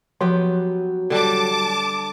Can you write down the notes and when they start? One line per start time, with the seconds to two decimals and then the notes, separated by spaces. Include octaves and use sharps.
0.21 F3 F#3 B3 G4
1.10 D3 G3 A5 D6